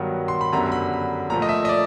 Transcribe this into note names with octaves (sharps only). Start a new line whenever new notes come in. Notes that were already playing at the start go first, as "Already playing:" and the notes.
Already playing: G2 D#3 F#3 B3
C6
B5
F#2 D3 G3 B3 A#5
B5
A#2 F3 A3 A#5
D#5
E5
D#5
D5